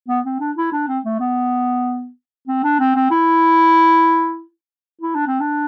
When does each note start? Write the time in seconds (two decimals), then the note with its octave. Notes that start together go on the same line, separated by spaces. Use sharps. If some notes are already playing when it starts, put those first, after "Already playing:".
0.09 B3
0.25 C4
0.40 D4
0.57 E4
0.72 D4
0.88 C4
1.05 A3
1.20 B3
2.48 C4
2.64 D4
2.80 C4
2.96 C4
3.11 E4
5.02 E4
5.15 D4
5.27 C4
5.40 D4